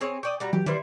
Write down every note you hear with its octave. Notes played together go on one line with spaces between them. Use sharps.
C4 G#4 C#5
D5 G5 C#6 D#6
G3 F#4 A#5
E3 F#3 G4
D#3 G3 E4 B4 C5 C6